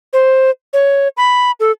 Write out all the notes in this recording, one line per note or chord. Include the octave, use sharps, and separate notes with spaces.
C5
C#5
B5
A4